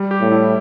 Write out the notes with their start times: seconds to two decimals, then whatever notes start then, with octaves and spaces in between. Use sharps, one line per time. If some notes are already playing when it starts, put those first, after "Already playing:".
Already playing: G3
0.11 G4
0.21 A2
0.32 E4